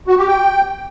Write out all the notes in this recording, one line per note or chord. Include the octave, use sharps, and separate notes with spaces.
F#4
G4
G5